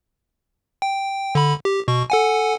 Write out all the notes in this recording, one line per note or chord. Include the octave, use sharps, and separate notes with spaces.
G5
D3 B5
G4
B2 C#6
A4 F#5 G#5